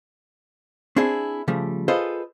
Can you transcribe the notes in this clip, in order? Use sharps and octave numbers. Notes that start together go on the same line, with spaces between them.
C4 D4 E4 G#4
C#3 F3 G3 A3
F4 G#4 A4 B4 C5 D#5